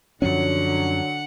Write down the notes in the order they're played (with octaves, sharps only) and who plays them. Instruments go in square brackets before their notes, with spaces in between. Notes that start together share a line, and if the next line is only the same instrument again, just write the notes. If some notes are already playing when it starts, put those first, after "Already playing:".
[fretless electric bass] F#2 F3 C#4 [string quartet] D3 [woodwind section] F#3 [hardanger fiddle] F#5